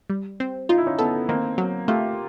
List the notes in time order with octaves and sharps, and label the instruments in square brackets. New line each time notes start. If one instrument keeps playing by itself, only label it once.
[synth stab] G3
C4
[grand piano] D#4 [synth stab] F4
[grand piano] E4
C#4 D#4
[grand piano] B3 [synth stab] A4
[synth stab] D#3 [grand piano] A#3 C4
[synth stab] F#3
[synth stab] A3 [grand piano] F4 G4